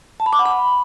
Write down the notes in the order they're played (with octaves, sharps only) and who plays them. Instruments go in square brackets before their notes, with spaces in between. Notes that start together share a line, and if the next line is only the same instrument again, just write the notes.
[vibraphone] A5
B5
D6
F#5
B5